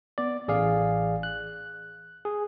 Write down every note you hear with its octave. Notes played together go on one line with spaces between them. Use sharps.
B3 D5
A1 G#4 D5 F5
F#6
G#4